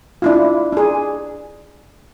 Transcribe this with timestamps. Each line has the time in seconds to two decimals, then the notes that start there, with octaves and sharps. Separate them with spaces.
0.22 D4 E4 F4
0.73 D4 G#4